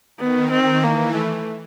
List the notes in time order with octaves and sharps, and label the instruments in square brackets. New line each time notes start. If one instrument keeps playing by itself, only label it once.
[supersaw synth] D#3 [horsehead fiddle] B3
[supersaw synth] D#3 [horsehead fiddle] C4
[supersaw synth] E3 [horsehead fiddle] A#3
[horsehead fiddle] A3